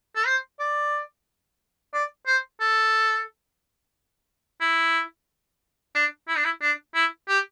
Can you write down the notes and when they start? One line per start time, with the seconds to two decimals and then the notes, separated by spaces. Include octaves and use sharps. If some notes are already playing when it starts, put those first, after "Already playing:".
0.16 A4
0.26 C5
0.60 D5
1.94 D5
2.27 C5
2.61 A4
4.61 E4
5.95 D4
6.28 E4
6.37 D4
6.45 E4
6.62 D4
6.95 E4
7.29 G4